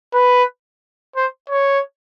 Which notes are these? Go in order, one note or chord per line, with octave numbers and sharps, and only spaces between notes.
B4
C5
C#5